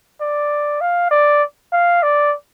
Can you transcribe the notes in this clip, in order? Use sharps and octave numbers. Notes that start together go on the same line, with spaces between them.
D5
F5
D5
F5
D5